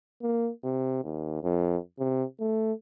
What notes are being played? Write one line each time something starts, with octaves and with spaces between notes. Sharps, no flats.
A#3
C3
D#2
F2
C3
A3